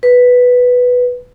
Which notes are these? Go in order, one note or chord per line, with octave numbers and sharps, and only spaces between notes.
B4